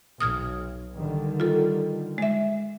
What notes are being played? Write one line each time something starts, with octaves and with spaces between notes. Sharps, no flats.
B1 D#6 F6 G#6
D3 D#3 G3
F4 A4
G#3 E5